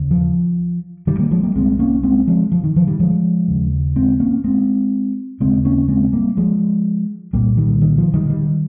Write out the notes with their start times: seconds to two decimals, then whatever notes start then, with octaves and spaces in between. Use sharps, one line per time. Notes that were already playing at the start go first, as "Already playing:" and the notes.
Already playing: D#2 C#3
0.11 F3
1.07 D#3 G3
1.19 G3 A#3
1.31 F3 G#3
1.43 G3 A#3
1.55 C2 C3 G#3 C4
1.79 A#3 C#4
2.03 G#3 C4
2.28 F3 G#3
2.52 F3
2.64 D#3
2.76 F3
2.88 D#3 G3
3.00 F3 G#3
3.48 D#2 C#3
3.96 G#3 C4
4.20 A#3 C#4
4.44 G#3 C4
5.40 D#2 C#3 G#3 C4
5.65 A#3 C#4
5.88 G#3 C4
6.13 G3 A#3
6.37 F3 G#3
7.33 C2 A#2 G3 A#3
7.57 D#3 G3
7.81 D#3
7.98 F3
8.13 D#3 G3
8.30 D#3 G3